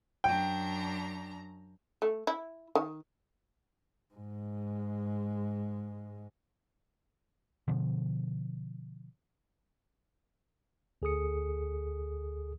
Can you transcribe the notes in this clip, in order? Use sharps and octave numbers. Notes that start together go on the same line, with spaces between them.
F#2 D4 G5 A#5
A3
E4
D#3
G#2 G#3
B2 D3 F3
D2 G#4 A4 D#6 C#7